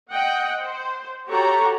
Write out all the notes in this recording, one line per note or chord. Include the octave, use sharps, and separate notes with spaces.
D#5 F#5 G5
C5
F#4 G4 A4 C#5 A#5